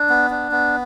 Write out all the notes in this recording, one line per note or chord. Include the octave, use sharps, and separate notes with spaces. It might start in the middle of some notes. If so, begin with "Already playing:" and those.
Already playing: D4
B3
D4
B3